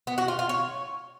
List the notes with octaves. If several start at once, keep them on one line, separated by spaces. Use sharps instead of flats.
B3
F#4
F4
F4
C#5